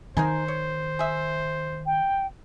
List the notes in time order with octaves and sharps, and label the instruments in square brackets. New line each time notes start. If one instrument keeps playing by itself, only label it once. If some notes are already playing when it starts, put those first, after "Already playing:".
[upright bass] D#3 [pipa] D#4 A#4 G#5 [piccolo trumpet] C5
[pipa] C#5
G#4 E5
[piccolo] G5